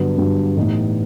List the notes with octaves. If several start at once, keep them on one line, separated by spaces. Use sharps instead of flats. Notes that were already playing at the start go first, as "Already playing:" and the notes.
Already playing: G2 D3 F#3 B3
G2 D3 F#3 B3
A2 E3 G3 B3 D#4